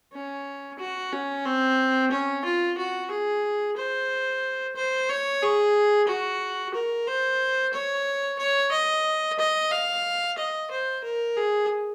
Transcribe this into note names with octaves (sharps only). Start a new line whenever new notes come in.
C#4
F#4
C#4
C4
C#4
F4
F#4
G#4
C5
C5
C#5
G#4
F#4
A#4
C5
C#5
C#5
D#5
D#5
F5
D#5
C5
A#4
G#4